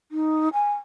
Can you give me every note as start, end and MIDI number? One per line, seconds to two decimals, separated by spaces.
0.12 0.49 63
0.53 0.73 80